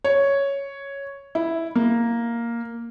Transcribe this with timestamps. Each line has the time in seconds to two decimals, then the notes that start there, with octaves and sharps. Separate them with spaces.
0.04 C#5
1.35 E4
1.75 A#3